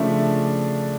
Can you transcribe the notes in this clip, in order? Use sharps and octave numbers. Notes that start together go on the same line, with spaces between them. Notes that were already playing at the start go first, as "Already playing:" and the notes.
Already playing: C#3 F3 A3 D4 E5